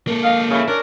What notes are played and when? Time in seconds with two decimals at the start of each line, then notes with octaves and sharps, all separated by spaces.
0.08 A#3 A4
0.24 D#5 F5
0.51 C#3 E4
0.68 C#4 D4 A#4